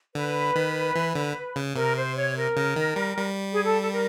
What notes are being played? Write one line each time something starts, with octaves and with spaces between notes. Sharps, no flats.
D3 B4
D#3
E3
D3
C#3
C3 A#4
C5
C#5
A#4
C#3
D#3
G3
G3
G#4
A4
A4
A#4